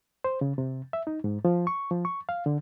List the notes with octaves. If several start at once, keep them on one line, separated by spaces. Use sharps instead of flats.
C5
C#3
C3
E5
D#4
G#2
F3
C#6
F3
C#6
F5
D3